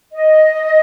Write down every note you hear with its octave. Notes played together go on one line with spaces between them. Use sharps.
D#5